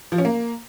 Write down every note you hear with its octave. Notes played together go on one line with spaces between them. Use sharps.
F3
C#4
A#3